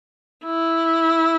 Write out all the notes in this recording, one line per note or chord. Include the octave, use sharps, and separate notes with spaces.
E4